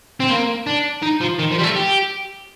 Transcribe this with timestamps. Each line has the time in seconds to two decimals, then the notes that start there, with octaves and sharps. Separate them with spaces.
0.20 C4
0.30 A#3
0.67 D4
1.03 D#4
1.21 F3
1.39 D#3
1.51 F3
1.58 G3
1.63 A3
1.76 G4